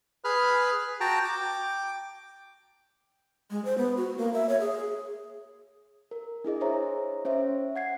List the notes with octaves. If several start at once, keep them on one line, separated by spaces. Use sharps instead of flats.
G#4 B4 B5 F6
F#4 G5 A5 A#5
G5 D6
G#3
C5
B3
F#4
A#3
E5
C#5
G#4
A#4
D4 E4 G#4 D#5
C5 C#5 D#5 E5 A#5
C#4 C5 C#5 E5
F#5 G#6 C7